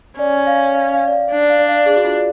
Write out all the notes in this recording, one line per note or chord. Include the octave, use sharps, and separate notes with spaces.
C#4 D5
F5
F5
F5
D5
F5
D4 D5
F5
D5
F5
G#4
F#4
F4